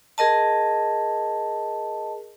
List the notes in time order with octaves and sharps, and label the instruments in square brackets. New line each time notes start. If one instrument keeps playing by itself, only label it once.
[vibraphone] G#4 A#4 D#5 A5